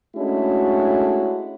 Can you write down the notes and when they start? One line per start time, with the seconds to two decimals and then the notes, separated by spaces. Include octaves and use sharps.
0.16 G#3 A3 C#4 D4 E4 F#4